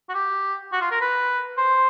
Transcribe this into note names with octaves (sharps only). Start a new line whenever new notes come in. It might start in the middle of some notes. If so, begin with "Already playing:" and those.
F#4
G4
F#4
F4
A#4
B4
C5